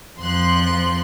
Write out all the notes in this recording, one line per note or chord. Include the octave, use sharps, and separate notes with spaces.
F2 F3 C6 F#6